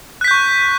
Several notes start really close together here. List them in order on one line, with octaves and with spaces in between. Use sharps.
F#6 B6 G6 C#6